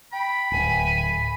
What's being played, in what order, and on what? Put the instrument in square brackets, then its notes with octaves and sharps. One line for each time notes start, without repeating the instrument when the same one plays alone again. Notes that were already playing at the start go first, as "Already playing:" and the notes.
[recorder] G5 [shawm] B5
[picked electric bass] D1 [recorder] G#5